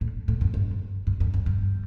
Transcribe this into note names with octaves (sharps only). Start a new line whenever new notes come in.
A2
A2
F#2
G2
G2
F#2
F#2
G2